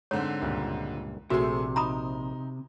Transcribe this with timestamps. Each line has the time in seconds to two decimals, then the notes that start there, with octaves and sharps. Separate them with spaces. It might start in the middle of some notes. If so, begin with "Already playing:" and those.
0.11 G#2 D3 C4 C#5
0.42 C#2 G2 A#2
1.30 A#1 C3 A3 F#4 G#4 E5
1.76 D#4 A#5 B5 D#6